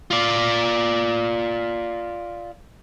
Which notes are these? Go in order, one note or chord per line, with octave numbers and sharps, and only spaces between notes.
F4 D5